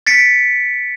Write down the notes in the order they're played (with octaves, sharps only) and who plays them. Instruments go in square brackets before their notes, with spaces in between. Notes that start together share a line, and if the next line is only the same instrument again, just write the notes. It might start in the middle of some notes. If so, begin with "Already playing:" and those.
[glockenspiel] A6 B6 C#7 D7